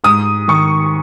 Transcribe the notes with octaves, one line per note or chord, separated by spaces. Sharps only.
G#2 D#6
D#3 C#6